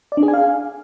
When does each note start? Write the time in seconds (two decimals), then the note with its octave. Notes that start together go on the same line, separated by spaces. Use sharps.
0.12 D5
0.17 D4
0.23 G#4
0.28 G#5
0.33 F5